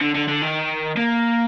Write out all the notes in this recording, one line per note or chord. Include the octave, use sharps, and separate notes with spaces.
D3
D3
D3
D#3
A#3